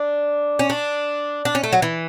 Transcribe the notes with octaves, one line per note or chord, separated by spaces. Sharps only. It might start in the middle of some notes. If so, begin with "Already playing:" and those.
Already playing: D4
C#4
D4
D4
C#4
A3
F#3
E3